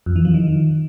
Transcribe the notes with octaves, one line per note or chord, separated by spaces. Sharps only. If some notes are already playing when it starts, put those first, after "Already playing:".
F2
E3
F3
D#3